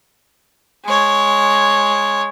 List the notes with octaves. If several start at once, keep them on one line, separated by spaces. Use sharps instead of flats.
G#3 C#5